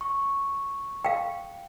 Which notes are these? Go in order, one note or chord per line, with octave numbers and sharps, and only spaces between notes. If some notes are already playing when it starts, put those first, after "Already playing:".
C#6
F5 G5